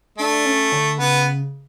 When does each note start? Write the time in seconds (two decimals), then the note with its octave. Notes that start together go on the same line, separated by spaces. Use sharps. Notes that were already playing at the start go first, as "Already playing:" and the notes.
0.18 A3 D4
0.46 C#4
0.72 D3
0.99 C#3 B3